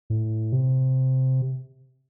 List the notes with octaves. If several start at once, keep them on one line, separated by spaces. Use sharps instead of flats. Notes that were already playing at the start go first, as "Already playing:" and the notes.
A2
C3